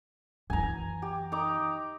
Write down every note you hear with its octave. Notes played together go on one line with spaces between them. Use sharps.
F#2 E3 G#5 A#5
G4
D#4 A#5 D6